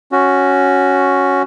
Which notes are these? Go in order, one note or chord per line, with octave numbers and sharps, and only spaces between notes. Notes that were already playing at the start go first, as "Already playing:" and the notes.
C#4 F#4